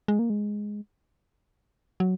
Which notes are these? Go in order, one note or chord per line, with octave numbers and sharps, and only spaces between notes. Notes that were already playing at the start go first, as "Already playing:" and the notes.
G#3
A#3
G#3
F#3